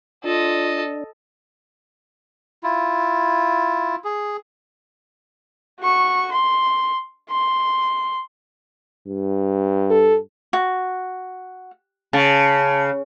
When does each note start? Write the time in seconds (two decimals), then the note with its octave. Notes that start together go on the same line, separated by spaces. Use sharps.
0.24 D4 F4 A4 D#5
2.63 E4 F4
4.04 G#4
5.80 F#4 C#6
6.32 C6
7.30 C6
9.07 G2
9.90 A4
10.53 F#4
12.13 C#3 A5